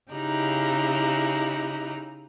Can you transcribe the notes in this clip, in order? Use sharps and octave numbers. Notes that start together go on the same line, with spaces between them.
C#3 D#4 E4 G4 A#5 F#6